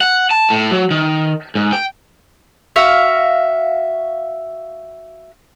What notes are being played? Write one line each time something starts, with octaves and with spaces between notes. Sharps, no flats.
F#5
A5
A2
F#3
D#3
G#2
G5
F#4 E5 F5